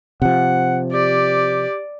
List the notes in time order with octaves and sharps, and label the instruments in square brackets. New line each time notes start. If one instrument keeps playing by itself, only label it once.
[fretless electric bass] C3 F3 [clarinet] F#5
[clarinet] G4 [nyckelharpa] D5